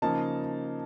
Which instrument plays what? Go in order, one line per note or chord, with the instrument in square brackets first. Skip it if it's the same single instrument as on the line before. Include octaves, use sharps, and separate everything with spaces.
[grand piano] C#3 F3 A#3 D#4 A5